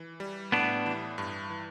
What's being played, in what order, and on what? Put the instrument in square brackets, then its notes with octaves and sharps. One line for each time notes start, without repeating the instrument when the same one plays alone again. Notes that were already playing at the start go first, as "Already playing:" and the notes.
Already playing: [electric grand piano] E3
G3
[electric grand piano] A2 [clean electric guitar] B3 D4
[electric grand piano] E3
G2
E3